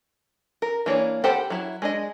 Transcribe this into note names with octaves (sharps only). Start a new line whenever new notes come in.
A#4
E3 A#3 D4 C#5
G4 A4 C5 F#5 B5
F#3 E4
G#3 D4 D#5